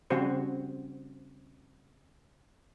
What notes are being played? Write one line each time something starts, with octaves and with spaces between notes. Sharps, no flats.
C#3 G3 C4 F#4 C5